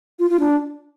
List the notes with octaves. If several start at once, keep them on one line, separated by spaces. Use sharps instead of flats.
F4
F4
D4